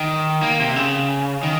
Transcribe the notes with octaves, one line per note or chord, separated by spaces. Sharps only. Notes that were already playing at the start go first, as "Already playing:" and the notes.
Already playing: D#3
A#3
C3
C#3
D#3